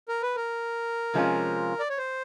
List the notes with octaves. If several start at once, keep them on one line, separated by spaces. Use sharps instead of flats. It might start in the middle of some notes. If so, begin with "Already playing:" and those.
A#4
B4
A#4
C3 F3 G#3 C#4 F4
D5
C#5
C5